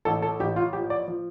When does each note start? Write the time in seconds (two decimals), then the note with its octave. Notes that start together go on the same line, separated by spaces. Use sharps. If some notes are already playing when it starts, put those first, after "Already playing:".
0.05 A1 A4
0.22 A4
0.40 A1 G4
0.56 F4
0.73 F3 G4
0.90 D5
1.08 F3